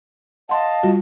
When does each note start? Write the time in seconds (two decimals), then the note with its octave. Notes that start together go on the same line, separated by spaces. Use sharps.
0.49 D#5 F5 F#5 A5 C6
0.83 G3 F4 F#4